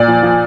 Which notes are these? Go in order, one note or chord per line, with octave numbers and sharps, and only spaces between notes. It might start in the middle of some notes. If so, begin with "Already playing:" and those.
Already playing: A#2 D5
F3
F3